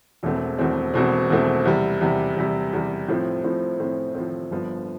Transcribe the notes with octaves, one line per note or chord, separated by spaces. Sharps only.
E1 E2 B2 A3 C4
E1 E2 B2 A3 C4
E1 E2 B2 A3 C4
E1 E2 B2 A3 C4
E2 C3 G3
E2 C3 G3
E2 C3 G3
E2 C3 G3
A2 F3 C4
A2 F3 C4
A2 F3 C4
A2 F3 C4
G1 G2 F3 B3